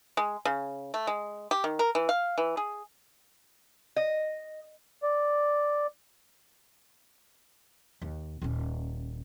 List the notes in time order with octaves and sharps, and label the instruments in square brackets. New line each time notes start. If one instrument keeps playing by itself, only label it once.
[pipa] G#3
C#3
A3
G#3
G4
D#3
A#4
E3
F5
E3
G#4
[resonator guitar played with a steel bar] D#5
[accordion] D5
[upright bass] D#2
D#1 C#4